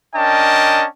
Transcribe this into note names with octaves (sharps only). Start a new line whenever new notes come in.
C#4 D4 A#4 D#5 G5 A5